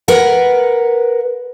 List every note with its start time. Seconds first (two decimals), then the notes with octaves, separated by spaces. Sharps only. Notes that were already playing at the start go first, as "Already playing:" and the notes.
0.08 A#4 B4 F#5